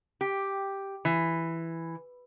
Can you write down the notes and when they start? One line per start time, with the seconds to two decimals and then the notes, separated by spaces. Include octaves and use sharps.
0.21 G4
1.05 E3